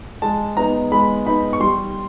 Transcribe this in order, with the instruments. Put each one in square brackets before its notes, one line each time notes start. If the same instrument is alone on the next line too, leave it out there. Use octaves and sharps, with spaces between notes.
[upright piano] G#3 [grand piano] A5
[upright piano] B3 D#4 [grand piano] A#5
[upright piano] G#3 [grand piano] B5
[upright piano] B3 D#4 [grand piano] B5
[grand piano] C#6
[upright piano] G3 [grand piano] C6